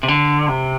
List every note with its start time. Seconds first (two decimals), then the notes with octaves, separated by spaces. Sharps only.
0.03 C3
0.08 D3
0.48 C3